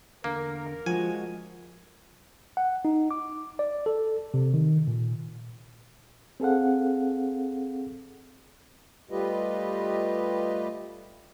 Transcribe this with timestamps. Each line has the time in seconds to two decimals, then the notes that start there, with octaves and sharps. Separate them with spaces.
0.24 E2 D3 A#3 A#4
0.86 F3 G#3 F#4 G#5
2.57 F#5
2.85 D#4
3.11 D6
3.59 D5
3.86 A4
4.34 C3
4.54 D#3
4.87 A#2
6.40 C4 G#4 A4 F5 F#5
9.11 G3 A3 F4 G4 B4 D#5